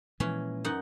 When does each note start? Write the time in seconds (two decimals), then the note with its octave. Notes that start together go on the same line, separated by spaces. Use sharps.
0.20 A#2 E3 F3 G#3 C#4
0.64 F#2 D#4 F#5